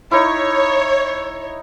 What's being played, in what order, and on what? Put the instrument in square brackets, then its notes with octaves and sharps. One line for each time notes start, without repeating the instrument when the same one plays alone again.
[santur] D#4 E4 [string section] C#5